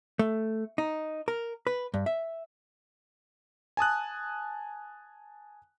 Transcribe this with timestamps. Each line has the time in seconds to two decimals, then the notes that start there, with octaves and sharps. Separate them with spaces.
0.19 A3
0.78 D#4
1.28 A#4
1.67 B4
1.94 G2
2.06 E5
3.77 G#5 A5 D#6 F#6